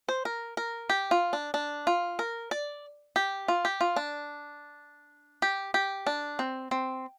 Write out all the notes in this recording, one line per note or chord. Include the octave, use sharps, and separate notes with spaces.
C5
A#4
A#4
G4
F4
D4
D4
F4
A#4
D5
G4
F4
G4
F4
D4
G4
G4
D4
C4
C4